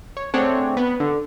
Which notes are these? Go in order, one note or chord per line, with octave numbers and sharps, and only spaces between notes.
C#5
A3 C4 D4 G#4 C#5 F#5
B3 B4
D3